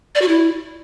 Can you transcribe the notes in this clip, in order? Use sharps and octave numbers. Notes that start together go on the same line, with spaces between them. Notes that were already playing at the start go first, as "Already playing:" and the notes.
D5
F#4
E4